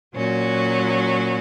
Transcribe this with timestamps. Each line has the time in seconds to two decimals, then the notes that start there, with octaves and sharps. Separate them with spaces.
0.15 A#2 F#3 C#4 F#4